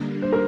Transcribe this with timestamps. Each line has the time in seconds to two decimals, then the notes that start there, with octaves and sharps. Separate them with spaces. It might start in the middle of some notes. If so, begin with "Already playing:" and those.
Already playing: D3 G3 A#3 D4
0.22 C5
0.32 A#4